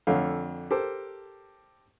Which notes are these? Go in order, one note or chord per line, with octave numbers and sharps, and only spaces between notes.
F2 D3 A3 C#5 F5
G4 A4 A#4 C5